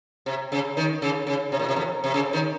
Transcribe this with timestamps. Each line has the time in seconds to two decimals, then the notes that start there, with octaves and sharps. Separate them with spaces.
0.26 C3
0.52 C#3
0.77 D#3
1.02 C#3
1.27 C#3
1.52 C3
1.59 A#2
1.69 C3
1.76 F2
2.04 C3
2.14 C#3
2.33 D#3